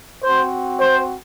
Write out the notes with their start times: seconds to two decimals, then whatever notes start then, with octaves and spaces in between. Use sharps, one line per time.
0.23 C4 F#4 C5
0.80 C5